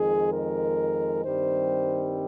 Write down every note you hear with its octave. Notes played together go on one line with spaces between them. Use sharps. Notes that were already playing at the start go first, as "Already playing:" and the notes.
Already playing: F2 D#3 G#3 G#4
A#4
G2 D#3 G3 C4 C5